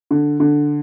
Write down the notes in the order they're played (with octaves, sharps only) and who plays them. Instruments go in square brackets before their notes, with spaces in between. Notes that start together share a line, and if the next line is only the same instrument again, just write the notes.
[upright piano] D3
D3